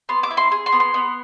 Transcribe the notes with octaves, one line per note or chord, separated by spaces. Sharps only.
B3 C6
D6
E4
C6
G#4
C6
B3
C6
B3